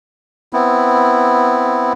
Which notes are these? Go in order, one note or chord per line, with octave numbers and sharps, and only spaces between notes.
B3 C4 E4